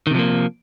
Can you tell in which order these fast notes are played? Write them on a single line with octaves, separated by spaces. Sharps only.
D#3 C3 F3 A#3